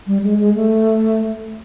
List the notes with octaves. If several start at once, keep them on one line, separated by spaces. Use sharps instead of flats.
G3
G#3
G#3
A3